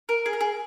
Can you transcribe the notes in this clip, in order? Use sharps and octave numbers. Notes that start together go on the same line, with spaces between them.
A#4
G#4
A#4
G#4